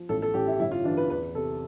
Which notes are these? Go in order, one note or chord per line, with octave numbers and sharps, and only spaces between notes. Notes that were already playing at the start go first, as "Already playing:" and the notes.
Already playing: F3
A1 A4
A4
A1 G4
E4
G1 E4
F4
E3 D4
B4
E2 B4
C3 A4